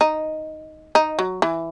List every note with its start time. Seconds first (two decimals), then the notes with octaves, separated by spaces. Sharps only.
0.01 D#4
0.95 D#4
1.19 F#3
1.42 E3